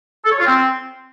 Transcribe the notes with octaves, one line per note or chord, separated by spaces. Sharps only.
A4
C#5
F4
C4